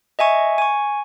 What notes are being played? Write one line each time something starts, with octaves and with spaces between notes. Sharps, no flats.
D#5 E5 G#5 C#6
G#5 C#6